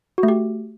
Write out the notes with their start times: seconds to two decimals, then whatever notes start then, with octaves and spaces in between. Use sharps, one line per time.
0.18 F#4
0.23 A3
0.28 G4